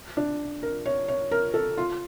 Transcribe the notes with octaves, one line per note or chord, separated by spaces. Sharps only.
D4
A#4
C#5
C#5
A#4
A4
F4